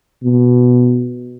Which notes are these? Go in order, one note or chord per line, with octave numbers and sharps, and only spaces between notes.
B2